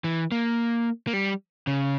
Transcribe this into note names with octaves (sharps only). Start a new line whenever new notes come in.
E3
A#3
A#3
G3
C#3